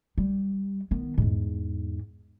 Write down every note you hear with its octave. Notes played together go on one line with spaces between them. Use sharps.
G3
D#3 B3
E2 G#2